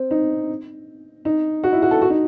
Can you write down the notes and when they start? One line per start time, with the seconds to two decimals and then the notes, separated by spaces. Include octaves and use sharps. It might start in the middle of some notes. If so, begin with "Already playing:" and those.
Already playing: C4
0.11 D#4
1.25 D#4
1.63 F#4
1.73 E4
1.82 F#4
1.91 A4
2.02 F#4
2.10 D#4